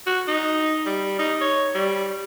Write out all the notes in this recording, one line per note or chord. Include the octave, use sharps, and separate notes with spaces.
F#4
D#4
G3
D#4
C#5
G3